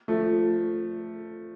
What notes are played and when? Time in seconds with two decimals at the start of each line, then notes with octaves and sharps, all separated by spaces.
0.08 F3 A3